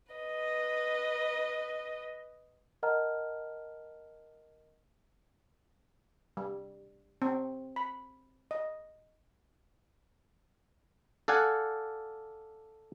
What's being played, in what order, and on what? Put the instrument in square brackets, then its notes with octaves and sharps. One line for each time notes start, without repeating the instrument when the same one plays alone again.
[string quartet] B4 D#5
[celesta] A#4 D#5 F#5 A5 A#5 F6
[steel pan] G3
C4
B5
D#5
[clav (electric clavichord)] A4 D5 F5 F#5 G#5